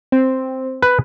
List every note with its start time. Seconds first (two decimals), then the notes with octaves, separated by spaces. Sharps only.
0.12 C4
0.82 B4